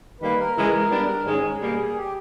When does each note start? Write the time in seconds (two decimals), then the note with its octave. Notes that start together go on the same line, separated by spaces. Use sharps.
0.21 D#3 G3 A#3 B4
0.38 A#4
0.56 C#3 E3 G#3
0.91 G3 B3 D4
1.25 G#2 D#3 G#3 C#4 G#4
1.60 B2 G3 A#3
1.95 G4